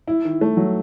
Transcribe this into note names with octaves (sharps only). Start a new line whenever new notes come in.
E4
D#3
A3
F#3